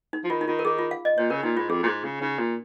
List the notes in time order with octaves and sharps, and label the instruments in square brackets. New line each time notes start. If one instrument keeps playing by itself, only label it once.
[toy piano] D#4
[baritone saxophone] F3
[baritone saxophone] D#3 [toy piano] F4
[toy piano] D#4
[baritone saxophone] D#3 [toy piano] F4
[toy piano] A#4
[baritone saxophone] D#3 [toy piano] G#4
[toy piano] F4
F5
D#5
[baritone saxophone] A#2 [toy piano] C#5
[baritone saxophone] C#3 [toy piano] A#4
[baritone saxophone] A#2 [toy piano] D#4
[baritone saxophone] G#2 [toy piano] F4
[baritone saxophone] F2 [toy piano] G#4
[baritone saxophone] A#2
G#2
C#3
[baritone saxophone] C#3 [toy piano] D#4
[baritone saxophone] A#2